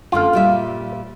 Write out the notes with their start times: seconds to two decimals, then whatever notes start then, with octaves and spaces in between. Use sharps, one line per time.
0.12 F#2 D3 A3 F4 F5
0.33 A#2 G3 E5